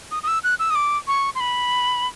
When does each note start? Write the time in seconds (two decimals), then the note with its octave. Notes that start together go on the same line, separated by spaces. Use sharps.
0.11 D#6
0.23 D#6
0.28 E6
0.44 F#6
0.59 E6
0.70 D#6
0.75 D6
1.07 C#6
1.35 C6
1.40 B5